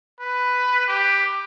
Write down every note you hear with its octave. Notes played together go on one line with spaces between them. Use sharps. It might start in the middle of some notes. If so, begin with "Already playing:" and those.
B4
G4